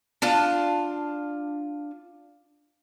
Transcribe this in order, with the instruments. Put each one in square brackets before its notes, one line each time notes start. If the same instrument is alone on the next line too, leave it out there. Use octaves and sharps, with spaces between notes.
[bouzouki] D4 F4 A5